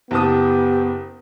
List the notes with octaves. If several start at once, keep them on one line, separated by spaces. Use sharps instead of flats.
F#1 B3 G4 A5 D#6